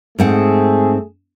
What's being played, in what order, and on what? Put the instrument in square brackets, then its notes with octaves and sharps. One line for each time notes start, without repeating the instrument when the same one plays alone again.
[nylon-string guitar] G#2 C4 F#5 [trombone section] A3 G#4